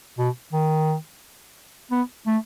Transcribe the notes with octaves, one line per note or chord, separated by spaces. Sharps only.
B2
D#3
B3
A3